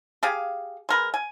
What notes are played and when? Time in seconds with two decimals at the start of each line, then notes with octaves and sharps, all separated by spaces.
0.23 G4 G#4 F5
0.89 G#3 A#4 B4
1.14 G#5